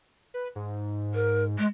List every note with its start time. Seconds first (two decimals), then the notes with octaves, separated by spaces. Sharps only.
0.34 B4
0.56 G#2
1.14 A#4
1.58 G#3